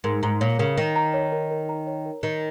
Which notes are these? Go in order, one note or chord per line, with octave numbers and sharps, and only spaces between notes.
G#2 A#4
G#2 A#5
A#2 C#5
C#3 A#4
D#3 A#4
A#5
C#5
A#4
A#4
A#5
C#5
A#4
D#3 A#4